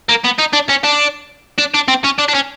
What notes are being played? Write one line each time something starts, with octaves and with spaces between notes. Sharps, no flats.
A#3
B3
D#4
D4
C#4
D4
D4
D4
C4
C#4
D4
D4
C#4